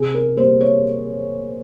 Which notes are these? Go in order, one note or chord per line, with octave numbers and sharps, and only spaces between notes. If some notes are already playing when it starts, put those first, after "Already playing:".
Already playing: C3 G#4
A#4
G3 A#3 C5
C#5